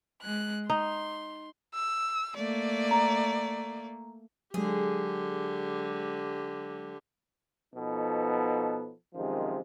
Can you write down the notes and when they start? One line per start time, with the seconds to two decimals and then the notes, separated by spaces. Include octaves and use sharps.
0.22 G#3 F#6
0.70 D#4 C6
1.75 E6
2.37 A3 A#3 D5
2.91 A#5
4.54 D3 F#3 G#3 G4 G#4
7.75 B2 F3 B3 D#4 A4
9.15 F#2 C3 D#3 F3 G#3